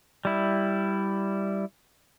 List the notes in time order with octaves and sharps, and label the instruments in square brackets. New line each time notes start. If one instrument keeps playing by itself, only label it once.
[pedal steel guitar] G3 E4